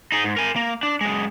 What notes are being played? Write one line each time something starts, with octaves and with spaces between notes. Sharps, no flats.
D#4 G#4
G#2
A#4 G#5
A#3
D4
F#2 G#3